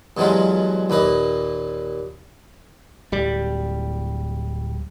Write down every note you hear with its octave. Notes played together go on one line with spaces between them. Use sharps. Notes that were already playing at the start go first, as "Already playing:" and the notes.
G2 B2 E3 F#3 G#3 F4
D#2 A#2 B4 D#5
D1 G3